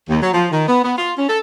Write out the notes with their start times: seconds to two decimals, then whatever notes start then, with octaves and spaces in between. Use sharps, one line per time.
0.09 D#2
0.22 F#3
0.33 F3
0.51 D#3
0.68 B3
0.84 B3
0.98 F4
1.17 C#4
1.29 A4